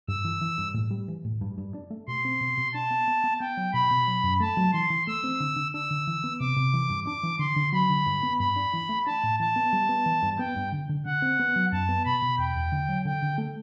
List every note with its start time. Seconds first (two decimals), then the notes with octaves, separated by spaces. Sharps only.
0.08 G2 E6
0.25 E3
0.41 E3
0.58 G2
0.74 A2
0.91 G3
1.08 E3
1.25 A2
1.41 G2
1.58 G2
1.74 D4
1.90 A3
2.08 B2 C6
2.25 C4
2.41 B2
2.57 B2
2.74 D4 A5
2.91 B3
3.08 B3
3.24 B3
3.40 B3 G5
3.57 F#3
3.74 B2 B5
3.91 B2
4.07 F#3
4.24 F#2
4.40 A3 A5
4.57 F#3
4.73 E3 C6
4.90 E3
5.07 A3 E6
5.24 C4
5.40 D3
5.56 D3
5.73 D4 E6
5.91 D3
6.07 E3
6.24 B3
6.40 C3 D6
6.56 C3
6.73 E3
6.90 G2
7.06 D4 D6
7.23 E3
7.39 D3 C6
7.56 D3
7.72 F#3 B5
7.90 D3
8.06 G2
8.23 B3
8.39 G2 B5
8.56 D4
8.73 E3
8.89 A3
9.07 D4 A5
9.23 A2
9.40 E3 A5
9.56 B3
9.73 G3
9.89 B3
10.06 E3
10.23 G2
10.39 B3 G5
10.56 G2
10.72 D3
10.89 D3
11.05 D3 F#5
11.22 C4
11.39 B3
11.56 F#3
11.72 F#2 A5
11.89 B3
12.06 B2 B5
12.22 B2
12.38 E2 G5
12.55 E2
12.72 D3
12.88 F#3
13.05 D3 G5
13.22 D3
13.38 A3